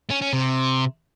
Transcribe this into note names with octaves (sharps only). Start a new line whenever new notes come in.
C#4
C#4
C3